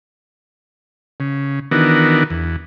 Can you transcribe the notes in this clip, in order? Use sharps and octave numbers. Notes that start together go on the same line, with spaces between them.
C#3
D#3 E3 B3 D4 F#4 A#4
E2